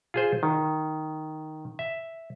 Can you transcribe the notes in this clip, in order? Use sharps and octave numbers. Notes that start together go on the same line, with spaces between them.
F4 G#4 C5
D#3
E5